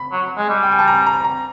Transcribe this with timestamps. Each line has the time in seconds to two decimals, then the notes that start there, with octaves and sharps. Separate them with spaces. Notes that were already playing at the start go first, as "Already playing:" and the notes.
Already playing: B5
0.12 F#3
0.37 G#3
0.49 G3
0.63 G5
0.72 G#5
0.79 A5
0.88 A#5
1.06 A#5
1.24 A#5